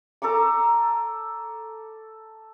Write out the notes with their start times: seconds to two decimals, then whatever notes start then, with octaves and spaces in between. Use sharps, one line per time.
0.22 A4 A#5 C#6 D6